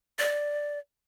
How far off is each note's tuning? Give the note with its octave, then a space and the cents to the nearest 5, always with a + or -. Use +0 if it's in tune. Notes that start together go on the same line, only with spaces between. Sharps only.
D5 +0